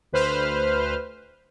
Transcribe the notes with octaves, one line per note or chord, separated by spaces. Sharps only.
D2 B4 C5 F6